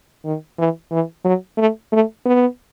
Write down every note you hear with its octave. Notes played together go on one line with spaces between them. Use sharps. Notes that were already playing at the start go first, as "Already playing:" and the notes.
D#3
E3
E3
F#3
A3
A3
B3